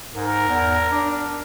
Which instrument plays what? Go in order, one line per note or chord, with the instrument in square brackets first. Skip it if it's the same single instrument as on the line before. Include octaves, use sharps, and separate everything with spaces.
[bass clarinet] G#2 [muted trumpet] A#4
[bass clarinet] E2
D4